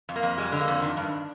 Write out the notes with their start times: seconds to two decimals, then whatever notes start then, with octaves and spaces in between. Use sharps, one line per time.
0.09 F2
0.16 A#3
0.23 F2
0.38 G3 G#3
0.52 D3
0.60 A#3
0.68 F2
0.82 D#3 D4
0.97 G2